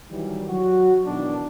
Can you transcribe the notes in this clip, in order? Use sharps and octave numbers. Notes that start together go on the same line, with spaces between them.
D#3 E3 F#3 G3
F#3 F#4
B1 B2 D#3 E3 D4